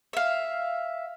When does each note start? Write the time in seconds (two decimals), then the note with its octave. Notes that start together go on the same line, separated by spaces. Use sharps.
0.13 E5 F5